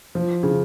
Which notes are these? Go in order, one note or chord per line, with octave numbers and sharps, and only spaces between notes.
F3
C#3